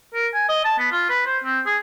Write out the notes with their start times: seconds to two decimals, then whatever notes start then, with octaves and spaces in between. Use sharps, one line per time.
0.15 A#4
0.34 G#5
0.49 D#5
0.65 A5
0.79 B3
0.92 F4
1.09 B4
1.26 C5
1.44 C4
1.66 G#4